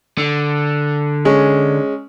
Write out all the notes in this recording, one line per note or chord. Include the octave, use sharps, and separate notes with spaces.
D3
G#3 C#4